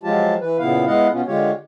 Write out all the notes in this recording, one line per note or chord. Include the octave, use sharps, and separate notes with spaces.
F3 F#3 G#3 F4 G4 A5
E3 B4
A#2 C#3 B3 E4 F5
G#3 B3 E4 D#5 F5 F#5
B2 B3 C#4 F4
D3 G#3 F4 G4 C#5